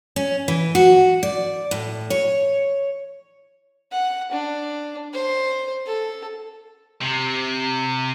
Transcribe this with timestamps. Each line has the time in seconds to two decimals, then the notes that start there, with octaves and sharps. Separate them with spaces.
0.16 C#4
0.48 E3
0.75 F#4
1.23 D5
1.71 A2
2.10 C#5
3.91 F#5
4.31 D4
5.13 C5
5.86 A4
7.01 C3